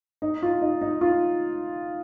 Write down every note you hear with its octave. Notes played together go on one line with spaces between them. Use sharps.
D#4
F4
D#4
D#4
F4